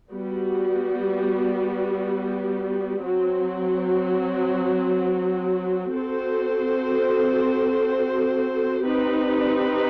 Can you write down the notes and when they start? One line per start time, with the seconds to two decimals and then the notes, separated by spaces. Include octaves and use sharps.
0.11 G3 B3 F#4
3.01 F#3 C4 F#4
5.93 C4 F#4 A4 C5
8.84 C4 D#4 G4 B4